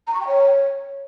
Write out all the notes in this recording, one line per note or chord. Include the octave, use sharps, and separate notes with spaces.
A#5
C#6
G5
C#5